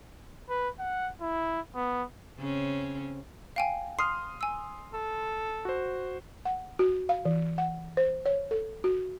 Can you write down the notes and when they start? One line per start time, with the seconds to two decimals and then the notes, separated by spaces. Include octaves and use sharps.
0.49 B4
0.79 F#5
1.21 E4
1.75 B3
2.39 C#3 C4 C#4
3.56 F5 G5 G#5
3.99 C6 D#6 F6 C7
4.41 G#5 E6
4.94 A4
5.65 F#4 C5
6.45 F#5
6.79 F#4
7.09 F5
7.25 E3
7.58 F#5
7.97 C5
8.26 C#5
8.51 A4
8.84 F#4